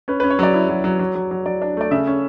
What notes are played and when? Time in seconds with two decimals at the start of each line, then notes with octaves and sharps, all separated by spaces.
0.08 C#4 B4
0.20 C#4 B4
0.30 C#5
0.39 F#3 D5
0.54 E4
0.69 F#3
0.84 F#3
0.99 F#3
1.15 F#3
1.31 F#3
1.46 F#3 D5
1.62 D4
1.77 A3 D5
1.91 C#3 E5
2.07 C#4